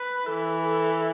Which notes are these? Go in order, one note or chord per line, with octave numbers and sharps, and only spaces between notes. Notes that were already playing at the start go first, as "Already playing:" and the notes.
Already playing: B4
E3 A4
A4